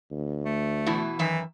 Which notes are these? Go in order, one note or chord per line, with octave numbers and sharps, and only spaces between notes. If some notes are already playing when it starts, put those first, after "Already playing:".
D2
A3
B2 E3 E4
F#2 D#3 E3 E5